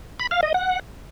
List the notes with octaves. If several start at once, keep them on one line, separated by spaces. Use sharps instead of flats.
B5
F5
D#5
F#5